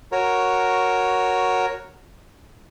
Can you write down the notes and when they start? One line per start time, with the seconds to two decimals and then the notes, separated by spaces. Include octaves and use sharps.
0.12 F#4 A#4 C#5